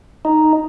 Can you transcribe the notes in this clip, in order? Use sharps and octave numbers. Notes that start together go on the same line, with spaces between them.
D#4